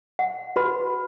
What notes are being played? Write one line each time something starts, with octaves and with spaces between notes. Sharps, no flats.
F#5
F#4 B4 B5